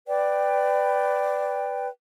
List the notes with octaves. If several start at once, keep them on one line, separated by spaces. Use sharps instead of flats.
B4 D5 G5